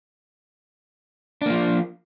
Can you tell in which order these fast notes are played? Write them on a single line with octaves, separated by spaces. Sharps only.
D4 A#3 F3